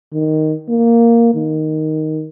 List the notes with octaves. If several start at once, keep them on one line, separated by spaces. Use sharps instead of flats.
D#3
A#3
D#3